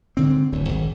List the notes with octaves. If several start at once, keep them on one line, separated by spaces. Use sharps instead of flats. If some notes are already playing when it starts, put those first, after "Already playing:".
G#2 D3 C4
D1 D2 E3
G#1 D2